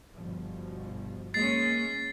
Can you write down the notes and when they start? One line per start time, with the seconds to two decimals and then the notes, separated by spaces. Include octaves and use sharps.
0.15 G1 B2 F3
1.34 G#3 A#3 C#4 A6 C7